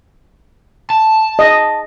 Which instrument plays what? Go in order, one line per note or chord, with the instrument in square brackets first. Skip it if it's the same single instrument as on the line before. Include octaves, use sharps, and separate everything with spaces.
[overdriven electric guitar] A5
[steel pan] D#5